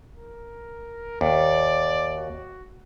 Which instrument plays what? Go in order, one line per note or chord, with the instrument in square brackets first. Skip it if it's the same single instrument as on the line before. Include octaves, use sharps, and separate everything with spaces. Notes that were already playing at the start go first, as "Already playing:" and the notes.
[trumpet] A#4
[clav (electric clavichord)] D#2 [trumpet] D5
[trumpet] F#4